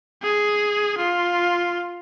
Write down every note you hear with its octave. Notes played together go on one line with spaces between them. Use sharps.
G#4
F4